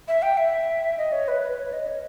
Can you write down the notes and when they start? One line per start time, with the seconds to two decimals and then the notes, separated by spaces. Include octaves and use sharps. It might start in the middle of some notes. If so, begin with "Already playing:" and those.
0.08 E5
0.22 G5
0.37 E5
0.98 D#5
1.12 C#5
1.28 B4
1.42 B4
1.58 C#5
1.73 D#5
1.87 C#5